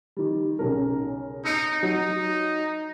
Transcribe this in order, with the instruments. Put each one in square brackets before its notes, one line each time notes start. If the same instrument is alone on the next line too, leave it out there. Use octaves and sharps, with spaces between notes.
[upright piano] D#3 G3
B1 C#3 A#4
[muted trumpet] D#4 [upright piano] E6 G6 C#7
[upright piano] F#3 [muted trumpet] D#4